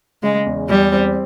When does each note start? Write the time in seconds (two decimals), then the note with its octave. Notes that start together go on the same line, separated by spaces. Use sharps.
0.23 C#3 G#3
0.46 E2
0.69 E2 G3
0.92 C4